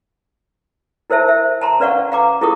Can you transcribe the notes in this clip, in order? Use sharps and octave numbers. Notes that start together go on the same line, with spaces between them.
E4 A#4 C5 E5 A5
E5
A5 A#5 C6
C#4 B4 D5 F5 F#5 C#6
F5 A#5 D6
E4 F4 G#4 A#4 C#6 D#6